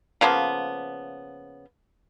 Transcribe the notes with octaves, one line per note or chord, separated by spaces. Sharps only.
C#3 F3 A#3 B3